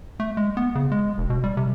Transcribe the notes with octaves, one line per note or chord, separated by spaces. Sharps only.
A3
G#3
B3
C#3
G#3
E1
B2
G3
C3